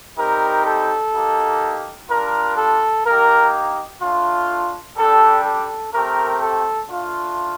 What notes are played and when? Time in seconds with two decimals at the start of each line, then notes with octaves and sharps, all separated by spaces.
0.18 G3 C4 D#4 G4 A#4
0.66 A4
1.15 A#3 D#4 G4
2.10 G3 D4 F4 A#4
2.57 A4
3.06 A#3 D#4 G4 A#4
4.02 A3 D4 F4
4.97 G3 D4 G4 A4
5.45 A4
5.93 A3 C4 G4 A#4
6.41 A4
6.89 A3 D4 F4